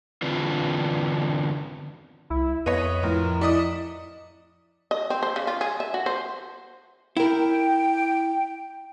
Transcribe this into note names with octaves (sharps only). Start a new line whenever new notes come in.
E2 D3 C4 D4 F4 B4
C2 E4
F2 B3 C#5 D#5 D#7
A2 F3 A#4
E4 D5 D#5 D#6 C#7
D#5
C4
C5
C#3
F4
G#4
E5
F#4
C5
E4 A#4 G5